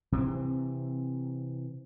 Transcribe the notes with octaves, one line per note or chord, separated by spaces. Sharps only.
C3 E3 C4